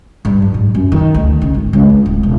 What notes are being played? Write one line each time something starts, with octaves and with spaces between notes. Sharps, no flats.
G2
F#3
G#2
F#2
D#3
D2
C#3
G#1
C#2
D#4
D1
E1